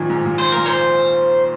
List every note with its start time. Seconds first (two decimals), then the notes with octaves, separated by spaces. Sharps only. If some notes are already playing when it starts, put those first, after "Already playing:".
Already playing: A#2 D#3 F3
0.10 G#2
0.25 A#2
0.39 C5
0.52 A#2 A#4
0.66 C5